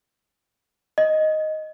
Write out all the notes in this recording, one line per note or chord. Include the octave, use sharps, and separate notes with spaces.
D#5